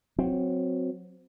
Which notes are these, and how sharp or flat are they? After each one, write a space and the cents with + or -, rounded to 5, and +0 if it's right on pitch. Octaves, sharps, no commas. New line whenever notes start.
F#3 -15 C4 -10